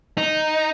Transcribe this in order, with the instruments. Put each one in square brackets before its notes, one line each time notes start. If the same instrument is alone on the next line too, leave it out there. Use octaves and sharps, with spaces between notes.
[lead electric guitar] D#4